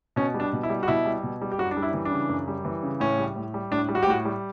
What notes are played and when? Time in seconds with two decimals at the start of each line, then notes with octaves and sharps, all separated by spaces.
0.16 B2 C#4
0.34 G3
0.40 D4
0.53 B2
0.63 E4
0.70 G3
0.83 F#4
0.88 B2 E4
1.06 G3
1.23 B2
1.41 G3
1.52 G4
1.58 F#2 F#4
1.71 D4
1.77 G3
1.83 E4
1.94 E3
2.05 D4
2.11 C#3
2.29 F#2
2.48 G3
2.65 E3
2.83 C#3
3.00 A2 C#4
3.19 G3
3.36 A2
3.54 G3
3.71 A2 D4
3.89 G3
3.95 F#4
4.03 G4
4.06 A2 F#4
4.25 G3